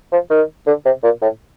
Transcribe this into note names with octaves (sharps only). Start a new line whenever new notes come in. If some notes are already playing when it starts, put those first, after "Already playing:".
F3
D#3
D3
C3
A#2
A2